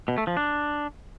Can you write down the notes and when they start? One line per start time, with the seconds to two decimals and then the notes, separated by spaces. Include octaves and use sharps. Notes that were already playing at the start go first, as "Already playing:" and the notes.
0.08 B2
0.18 A3
0.27 F3
0.37 D4